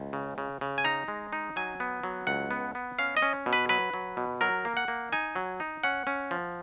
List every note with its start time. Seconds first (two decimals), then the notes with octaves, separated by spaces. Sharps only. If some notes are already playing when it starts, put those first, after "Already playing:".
Already playing: C#2
0.13 C#3
0.38 C#3
0.61 C#3
0.78 G#5
0.84 D#4 A#5
1.08 G#3
1.33 D#4
1.56 F#3 G#5
1.80 B3
2.03 F#3
2.27 C#2 F#5
2.51 B3
2.75 B3
2.99 C#4 F5
3.17 D#5
3.22 C#4
3.46 B2
3.53 B4
3.69 F#3 B4
3.94 F#3
4.17 B2
4.41 F#3 A#4
4.65 A#3
4.77 F#5
4.88 A#3
5.12 D#4 G#5
5.35 F#3
5.60 D#4
5.84 C#4 F#5
6.07 C#4
6.31 F3